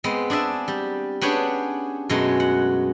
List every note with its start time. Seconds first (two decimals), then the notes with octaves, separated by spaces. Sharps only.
0.04 G#3 B3 C4
0.30 D4 G#4 D5 E5
0.68 G3
1.21 B3 C#4 D4 G4 G#4 C#5
2.09 F#2 B2 G#3 A3 B3
2.40 F#5